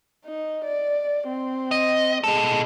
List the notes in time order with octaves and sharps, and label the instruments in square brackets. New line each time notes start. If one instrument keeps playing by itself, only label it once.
[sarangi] D#4
D5
C4
[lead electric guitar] D#5
[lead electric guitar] B2 A4 [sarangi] G#3